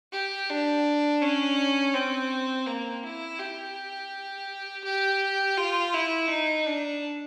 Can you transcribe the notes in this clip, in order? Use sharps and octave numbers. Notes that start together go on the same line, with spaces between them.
G4
D4
C#4
C4
A#3
E4
G4
G4
F4
E4
D#4
D4